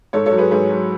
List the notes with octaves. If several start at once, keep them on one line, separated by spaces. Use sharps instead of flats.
G#2 A4 C#5
A4 C#5
F#3
G#4 B4
G#2 G#4 B4
F#3